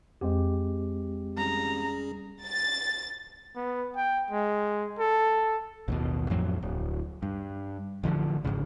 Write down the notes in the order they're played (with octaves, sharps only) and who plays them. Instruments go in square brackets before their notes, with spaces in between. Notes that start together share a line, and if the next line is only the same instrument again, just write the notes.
[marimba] F2 [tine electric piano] G#3 C4 G4
[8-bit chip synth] G3 C#4 G#4 [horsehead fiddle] A#5
[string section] A6
[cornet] B3
G5
G#3
A4
[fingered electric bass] A1 D#2 B2
F2 A2 F3 F#3
D1
G2
A1 D3 D#3 F3
G1 C2 G#2 C#3